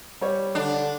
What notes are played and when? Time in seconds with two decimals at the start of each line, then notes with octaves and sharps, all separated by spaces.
0.21 G3 C#5
0.55 D3 D4